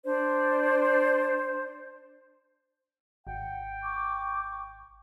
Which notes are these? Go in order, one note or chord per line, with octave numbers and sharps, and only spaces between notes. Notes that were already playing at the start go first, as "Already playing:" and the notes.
D4 C5 D5
G#1 F#5 G5
C#6 D6